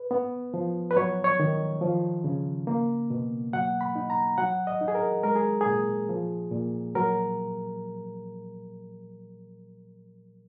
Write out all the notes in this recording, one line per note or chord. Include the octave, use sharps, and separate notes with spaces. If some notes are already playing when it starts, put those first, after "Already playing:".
Already playing: B4
B3
F3
B4
F#3 C#5
C#5
D#3
F3
C#3
A#3
B2
F#3 F#5
B5
D#4
A#5
F#3 F#5
D#5
D#4
G#4
A#4
G#3 A#4
G#4
G#4
A#2
F3
A#2
F#3 A#4